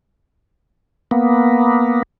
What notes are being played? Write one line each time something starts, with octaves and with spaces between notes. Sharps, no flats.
A#3 B3